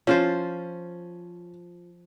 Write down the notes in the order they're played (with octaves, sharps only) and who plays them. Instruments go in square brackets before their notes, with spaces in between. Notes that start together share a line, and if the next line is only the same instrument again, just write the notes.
[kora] F3 F4 C5 [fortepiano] C#4